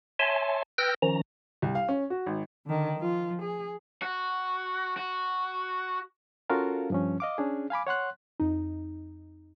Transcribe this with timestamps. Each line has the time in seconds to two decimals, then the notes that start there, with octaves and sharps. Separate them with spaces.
0.19 C#5 E5 G#5 A5 C6
0.78 B4 G5 E6 F6 G6 A#6
1.02 D#3 F3 C#4 A#5
1.62 C2
1.75 F5
1.89 C#4
2.10 F#4
2.26 G#1
2.66 D3 D#3
2.99 F3 F4
3.42 G#4
4.02 F#4
4.97 F#4
6.50 C#4 F4 F#4 A4 A#4 F5
6.90 G2 F3 C#4
7.20 D#5 F5 D6
7.38 C#4 D4 G#4
7.70 F5 G#5 B5 D6
7.87 C#5 F#5 C6 F#6
8.40 F2 D#4